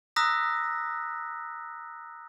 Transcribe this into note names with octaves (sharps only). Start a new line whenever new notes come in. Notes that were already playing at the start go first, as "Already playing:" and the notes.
A#5 D#6 E6 F#6 A#6 B6